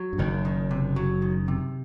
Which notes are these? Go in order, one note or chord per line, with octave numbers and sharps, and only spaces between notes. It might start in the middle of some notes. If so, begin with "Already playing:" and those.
Already playing: F#3
G2
F#1 F#2 D#3
D#3
C3
F#3
D#3
C3